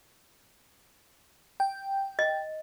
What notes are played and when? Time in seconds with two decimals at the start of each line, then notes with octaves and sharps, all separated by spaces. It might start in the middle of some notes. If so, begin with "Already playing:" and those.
1.60 G5
2.19 D#5